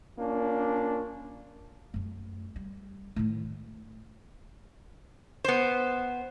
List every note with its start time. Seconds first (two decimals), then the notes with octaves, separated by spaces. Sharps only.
0.18 A#3 C#4 D4 F4
1.94 F#2 A3
2.56 G3
3.16 A2 D#3
5.44 B3 C5